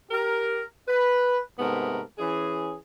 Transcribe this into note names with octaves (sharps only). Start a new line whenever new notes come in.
G4 A#4
B4
G#2 C3 A3 B3 A#4
E3 C#4 G#4